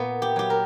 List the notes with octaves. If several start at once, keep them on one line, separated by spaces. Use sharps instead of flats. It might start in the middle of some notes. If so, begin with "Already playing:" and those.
Already playing: A#2 B3
G4
F#3 G4
A#4